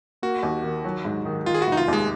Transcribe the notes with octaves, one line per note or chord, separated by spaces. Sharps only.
A#3 F#4
D#2
D#3
F#3
G#2
D#3
D#3 F4
G#4
F1 F#4
D#4
F4
D#2 G#3